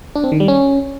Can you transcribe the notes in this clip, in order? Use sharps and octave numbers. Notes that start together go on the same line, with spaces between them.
D4
C4
D#3
G3
C#4